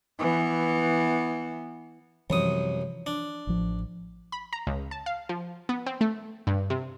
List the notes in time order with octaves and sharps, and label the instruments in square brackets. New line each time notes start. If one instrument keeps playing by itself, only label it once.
[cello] E3 B3
[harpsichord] C2 F#2 D#6 [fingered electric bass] E3 F3
[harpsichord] D4
[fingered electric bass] A1 F3
[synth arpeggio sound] B5
A#5
C#2
A5
F5
F3
B3
C4
A3
G2
C3